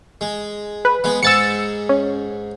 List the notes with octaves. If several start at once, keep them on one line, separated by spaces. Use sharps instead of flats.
G#3
B4
G#3 B3
G#2 G#3 E6 A6 C#7
C#4